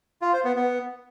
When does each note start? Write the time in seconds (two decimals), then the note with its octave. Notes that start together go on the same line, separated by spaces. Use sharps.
0.22 F4
0.33 C5
0.44 B3
0.56 B3